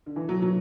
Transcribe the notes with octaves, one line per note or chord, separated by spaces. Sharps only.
D3
E3
F#3
F#3